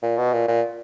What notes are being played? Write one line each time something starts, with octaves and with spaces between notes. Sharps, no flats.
A#2
B2
A#2
A#2